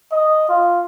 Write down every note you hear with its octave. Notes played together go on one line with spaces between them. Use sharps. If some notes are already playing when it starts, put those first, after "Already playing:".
D#5
F4